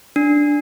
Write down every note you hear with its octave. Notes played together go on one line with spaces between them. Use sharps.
D4